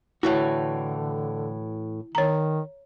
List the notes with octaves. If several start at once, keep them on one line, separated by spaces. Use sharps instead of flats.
A2 D3 E3 E4 F#4
D#3 C#5 A#5